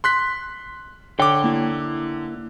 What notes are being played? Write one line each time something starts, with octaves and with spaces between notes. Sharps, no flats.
C6 F#6 B6
D3 C#5 G5 D6
A#3 E4